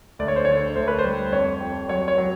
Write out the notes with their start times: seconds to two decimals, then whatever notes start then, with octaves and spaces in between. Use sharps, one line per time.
0.19 D2 D5
0.28 C#5
0.36 C5
0.45 D3 C#5
0.76 D2 C5
0.88 B4
0.99 C5
1.04 G3
1.33 F2 C#5
1.61 F2
1.89 F#3 C#5
2.08 C#5
2.18 F#3